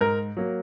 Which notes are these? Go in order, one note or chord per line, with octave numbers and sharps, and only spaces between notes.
G#2 A#4
F#3 A#3